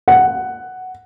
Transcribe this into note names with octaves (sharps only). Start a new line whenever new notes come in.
F#5